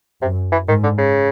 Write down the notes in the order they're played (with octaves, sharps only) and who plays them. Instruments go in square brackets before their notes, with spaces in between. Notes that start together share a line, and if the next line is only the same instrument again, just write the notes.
[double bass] F#2 [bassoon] C3
[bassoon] E3
[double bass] G#2 [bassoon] D#3
[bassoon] D3
C#3